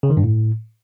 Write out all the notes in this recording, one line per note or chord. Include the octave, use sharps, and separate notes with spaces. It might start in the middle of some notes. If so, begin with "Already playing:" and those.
C#3
D#3
G2
A2